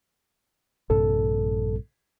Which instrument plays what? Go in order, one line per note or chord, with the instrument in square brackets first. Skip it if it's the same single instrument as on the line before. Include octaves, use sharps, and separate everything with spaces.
[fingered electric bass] A#1 G2 C3 [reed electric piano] A4